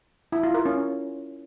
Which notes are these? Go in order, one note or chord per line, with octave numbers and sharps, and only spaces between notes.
E4
F4
A#4
C#4